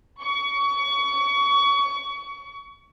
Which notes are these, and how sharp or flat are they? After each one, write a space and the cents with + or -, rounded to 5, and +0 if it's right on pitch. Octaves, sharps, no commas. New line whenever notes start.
C#6 +30